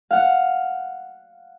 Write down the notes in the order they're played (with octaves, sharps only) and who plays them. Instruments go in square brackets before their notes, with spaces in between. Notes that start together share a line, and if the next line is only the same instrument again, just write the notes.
[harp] F5 F#5